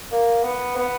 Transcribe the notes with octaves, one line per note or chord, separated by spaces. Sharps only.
A#3
B3
B3